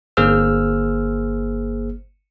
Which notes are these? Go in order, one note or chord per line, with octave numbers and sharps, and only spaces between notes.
G1 A#3 G#4 C5 E6 F6